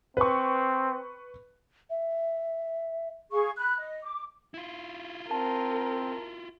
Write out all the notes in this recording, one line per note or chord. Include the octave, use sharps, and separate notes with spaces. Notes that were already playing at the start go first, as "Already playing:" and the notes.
C4 B4 C#6
E5
G#4 F5 C#6
B5 F#6
D#5
D6
E4 F4
C4 A#4 A5